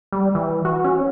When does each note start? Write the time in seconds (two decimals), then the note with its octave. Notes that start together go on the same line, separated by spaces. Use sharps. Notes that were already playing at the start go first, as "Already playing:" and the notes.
0.12 G3
0.35 E3
0.65 F#4
0.84 C#4